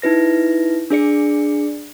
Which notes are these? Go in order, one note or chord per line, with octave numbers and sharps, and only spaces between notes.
D#4 E4 B4 A#6
D4 G#4 D5 C#7